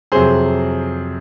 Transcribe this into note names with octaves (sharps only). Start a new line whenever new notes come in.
F2 C3 F#3 G#4 C5